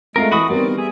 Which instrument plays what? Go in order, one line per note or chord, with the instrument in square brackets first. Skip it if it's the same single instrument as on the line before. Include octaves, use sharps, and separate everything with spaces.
[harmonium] G#3 A3 [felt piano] C4 C7 [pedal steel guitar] F4 A#4
[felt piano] E3 [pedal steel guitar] F#4 B5 D#6
[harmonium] D#3 A#4 [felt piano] G3 B3 [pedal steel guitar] C4 D5
[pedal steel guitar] G#4 [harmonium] E5